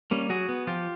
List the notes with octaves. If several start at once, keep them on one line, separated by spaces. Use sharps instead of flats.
G3 A#3 C#4
F#3 F#4 G#4
B3
F3 F4 G4